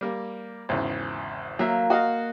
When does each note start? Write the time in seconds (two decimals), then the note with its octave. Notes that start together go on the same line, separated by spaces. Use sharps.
0.01 G3 A#3
0.69 G#1 E2 C#3
1.59 F#3 A#3 E5
1.90 F#4 D#5 F5